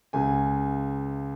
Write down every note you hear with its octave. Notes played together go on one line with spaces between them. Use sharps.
C#2 C#3 G#5